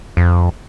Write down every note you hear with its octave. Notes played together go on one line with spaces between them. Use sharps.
F2